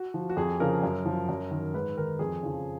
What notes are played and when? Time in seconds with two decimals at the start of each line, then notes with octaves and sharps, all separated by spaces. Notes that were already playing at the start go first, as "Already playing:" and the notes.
Already playing: F#4
0.14 F3
0.29 F#4
0.37 F2 G#4
0.60 C#3 F3 A#4
0.83 F#2
1.06 F3
1.29 F#2
1.51 D#3
1.74 G#2 B4
1.97 D#3 A#4
2.19 F2 G#4
2.43 C#3 F3